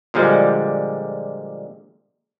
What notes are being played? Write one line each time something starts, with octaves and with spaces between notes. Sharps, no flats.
A#2 D3 F3 G3 G#3